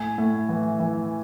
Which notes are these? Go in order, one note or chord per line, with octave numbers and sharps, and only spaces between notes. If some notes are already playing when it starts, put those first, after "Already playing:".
Already playing: A2 G#5
A2
E3
E3